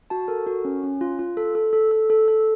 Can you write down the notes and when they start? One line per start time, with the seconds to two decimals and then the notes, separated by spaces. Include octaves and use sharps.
0.10 F#4 A5
0.28 A4 A#4
0.47 F#4
0.65 C#4
0.83 C#4
1.01 F4
1.19 F4
1.37 A4
1.55 A4
1.73 A4
1.91 A4
2.10 A4
2.28 A4